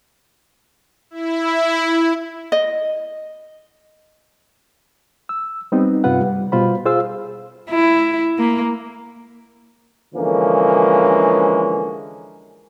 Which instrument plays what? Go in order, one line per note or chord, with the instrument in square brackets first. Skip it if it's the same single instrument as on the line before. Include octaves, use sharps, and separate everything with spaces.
[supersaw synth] E4
[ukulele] D#5
[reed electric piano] E6
G3 B3 C4 D#4
G2 C3 F4 B4 F#5
G3
B2 G3 F4 C5 B5
F4 G#4 C5 F5 E6
[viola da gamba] E4
A#3
[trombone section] D3 E3 F3 G#3 A#3 C#4